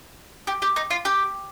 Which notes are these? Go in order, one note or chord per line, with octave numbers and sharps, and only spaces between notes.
G4
G4
D#4
F4
G4